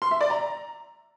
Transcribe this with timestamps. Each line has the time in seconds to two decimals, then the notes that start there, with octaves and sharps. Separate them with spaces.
0.02 C6
0.11 E5
0.21 D5
0.30 A#5